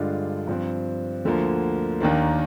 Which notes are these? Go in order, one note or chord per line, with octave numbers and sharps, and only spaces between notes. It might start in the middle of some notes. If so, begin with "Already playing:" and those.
Already playing: G2 D3 G#3 D4 F4
G2 F3 C4
D2 D3 F3 A#3
D#2 D#3 A#3 D4